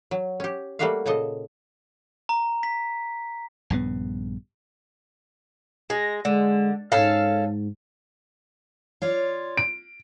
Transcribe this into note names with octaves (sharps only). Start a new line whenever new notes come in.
F#3
C#4 G4
G3 A3 A#3 F#4 E5 F5
A#2 C#3 A4 D#5
A#5
B6
A#1 G2 C#3 B3
G#3 A#6
D3 G#3
G#2 C#4 A4 F5
F4 C#5 D5
D7